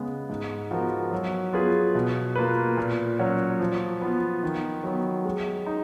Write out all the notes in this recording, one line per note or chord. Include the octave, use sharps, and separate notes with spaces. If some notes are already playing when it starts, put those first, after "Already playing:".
Already playing: C#3 G#3 B3
G#2
F3 B3 F#4 A#4
F#3
B3 F4 G#4 B4
B2
A#3 F4 B4
A#2
F#3 C#4 F#4 C#5
F3
B3 F4
D#3
F#3 B3
G#3
D#4